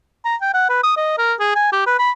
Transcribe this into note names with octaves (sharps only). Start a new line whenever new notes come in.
A#5
G5
F#5
B4
D#6
D#5
A#4
G#4
G#5
G4
B4
B5